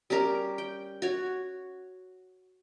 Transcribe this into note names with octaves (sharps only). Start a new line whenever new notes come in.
G3 C#4 G4 A#4
G5
F#4 C#5